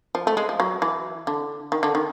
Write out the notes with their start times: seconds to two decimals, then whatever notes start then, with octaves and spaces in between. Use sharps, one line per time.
0.15 F3
0.27 A3
0.37 G#3
0.49 F3
0.60 F#3
0.82 E3
1.27 D3
1.72 D#3
1.83 D3
1.95 D#3